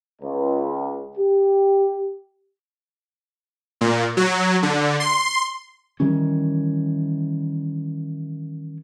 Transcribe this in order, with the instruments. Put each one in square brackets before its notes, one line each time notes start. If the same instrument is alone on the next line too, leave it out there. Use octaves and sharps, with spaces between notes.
[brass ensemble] C#2
G4
[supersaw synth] A#2
F#3
D3
C6
[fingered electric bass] D#3 E3 G3 C#4